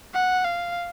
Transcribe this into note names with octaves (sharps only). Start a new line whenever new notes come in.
F#5
F5